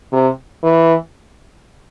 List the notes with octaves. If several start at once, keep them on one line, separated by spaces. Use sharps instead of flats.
C3
E3